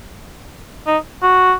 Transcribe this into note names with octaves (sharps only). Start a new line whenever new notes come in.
D#4
F#4